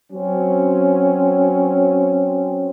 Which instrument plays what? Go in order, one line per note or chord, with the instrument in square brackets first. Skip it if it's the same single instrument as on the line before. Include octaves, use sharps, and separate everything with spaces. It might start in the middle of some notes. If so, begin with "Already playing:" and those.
[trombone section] F#3 C4 C#4